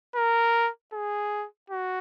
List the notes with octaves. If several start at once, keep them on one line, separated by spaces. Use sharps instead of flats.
A#4
G#4
F#4